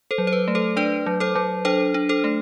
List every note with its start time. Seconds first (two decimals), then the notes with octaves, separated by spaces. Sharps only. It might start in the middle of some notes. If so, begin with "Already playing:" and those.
0.11 A4 C5
0.18 F#3
0.27 C5
0.33 B4
0.48 A3
0.55 A4 C5
0.76 D4 B4 D5
1.06 F#3
1.20 A4 C5
1.35 F#3
1.65 D4 A4 C5
1.94 D4
2.09 A4 C5
2.24 A3